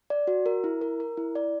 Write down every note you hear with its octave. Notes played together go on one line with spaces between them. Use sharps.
D5
F#4
A#4
E4
A#4
A#4
E4
D5